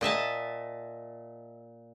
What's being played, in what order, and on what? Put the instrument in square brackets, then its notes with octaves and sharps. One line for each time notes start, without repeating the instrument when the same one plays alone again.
[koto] A#2 D#5 E5 A5